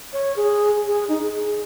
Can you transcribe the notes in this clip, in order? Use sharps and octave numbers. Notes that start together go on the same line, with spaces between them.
C#5
G#4
G#4
D#4
G#4